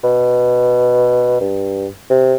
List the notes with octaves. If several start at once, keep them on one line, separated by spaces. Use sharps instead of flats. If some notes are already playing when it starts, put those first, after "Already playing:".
B2
G2
C3